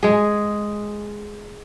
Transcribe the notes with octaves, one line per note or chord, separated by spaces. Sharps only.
G#3 G#4